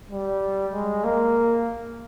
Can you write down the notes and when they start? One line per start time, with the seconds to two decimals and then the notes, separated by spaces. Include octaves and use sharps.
0.11 G3
0.73 G#3
1.04 A#3